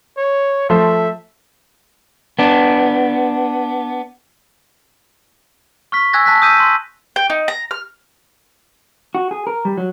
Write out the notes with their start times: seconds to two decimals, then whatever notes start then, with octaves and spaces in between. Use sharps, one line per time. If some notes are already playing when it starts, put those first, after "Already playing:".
0.18 C#5
0.70 F3 A3 C5 E5
2.39 B3 D4
5.92 C#6 F6 B6
6.13 G#5 E6 F#6 G#6 A#6
6.26 A5 F#6 B6
6.42 D#6 E6 G6 B6 D#7
6.60 C6
7.16 G5
7.30 D#4
7.48 A#5
7.71 F6
9.15 F#4
9.31 G#4
9.47 A#4
9.65 G3
9.78 F#3